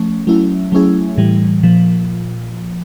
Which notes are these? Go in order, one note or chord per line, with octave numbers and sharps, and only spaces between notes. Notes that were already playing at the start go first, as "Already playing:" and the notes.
Already playing: F3 A3 C#4
F#3 A3 C#4 E4
F#3 A3 C#4 E4 G#4
A2 E3 G3
A#2 F3